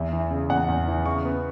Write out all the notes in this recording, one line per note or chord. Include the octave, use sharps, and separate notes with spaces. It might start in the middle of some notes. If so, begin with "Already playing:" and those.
Already playing: E2 E5
E3
C#3
E2 F#5
E2
E3
C#3 C#6
B3